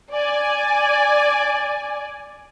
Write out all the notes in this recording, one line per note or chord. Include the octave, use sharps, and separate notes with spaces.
D5 G#5